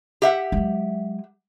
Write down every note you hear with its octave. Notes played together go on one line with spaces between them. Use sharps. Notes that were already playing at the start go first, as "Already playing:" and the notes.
G4 E5 F#5
F#3 G#3